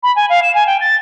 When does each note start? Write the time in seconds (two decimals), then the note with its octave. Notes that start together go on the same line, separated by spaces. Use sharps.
0.03 B5
0.16 G#5
0.30 F5
0.42 E7
0.55 G#5
0.67 G5
0.81 A6